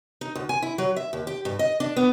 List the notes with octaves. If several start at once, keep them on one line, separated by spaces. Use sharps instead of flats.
D#4
D2
G#5
E4
F#3
E5
D#2
G4
G2
D#5
D4
B3